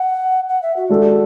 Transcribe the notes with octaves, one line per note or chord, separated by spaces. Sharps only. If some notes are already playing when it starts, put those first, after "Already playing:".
Already playing: F#5
F#5
E5
F#4
G#3 D4 A4